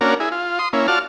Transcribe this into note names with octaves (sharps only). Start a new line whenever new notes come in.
A#3 C#4 D4 F#4 A#4
E4 G#4
F4
C6 D#6
A#3 C#4 E4
F4 F#4 D5 A5 F6